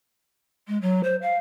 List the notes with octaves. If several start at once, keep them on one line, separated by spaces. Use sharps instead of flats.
G#3
F#3
C5
F5